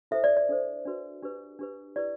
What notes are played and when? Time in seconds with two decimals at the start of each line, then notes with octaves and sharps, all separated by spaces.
0.11 E4 A4 C5 E5
0.24 D5
0.37 D5
0.49 D4 A4 C5
0.86 D4 F#4 B4
1.22 D4 G4 B4
1.59 D4 G4 B4
1.96 E4 G4 B4 D5